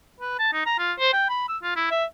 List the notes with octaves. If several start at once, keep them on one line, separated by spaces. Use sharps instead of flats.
B4
A5
D#4
A#5
F4
C5
G5
B5
E6
F4
E4
E5